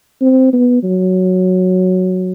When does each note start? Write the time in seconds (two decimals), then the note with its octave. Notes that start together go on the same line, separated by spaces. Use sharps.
0.21 C4
0.53 B3
0.84 F#3